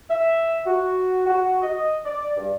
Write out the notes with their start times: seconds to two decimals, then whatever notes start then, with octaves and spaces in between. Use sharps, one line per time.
0.10 E5
0.66 F#4
1.26 F#4
1.61 D#5
2.05 D5
2.37 G2